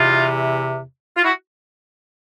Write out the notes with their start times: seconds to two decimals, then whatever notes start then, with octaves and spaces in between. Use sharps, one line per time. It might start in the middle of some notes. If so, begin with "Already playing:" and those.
Already playing: E2 C3 E3 D#4 F4
1.17 F4
1.24 E4 F#4